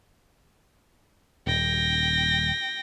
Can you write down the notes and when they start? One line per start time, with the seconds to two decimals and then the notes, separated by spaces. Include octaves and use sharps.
1.47 D#1 G5 A#6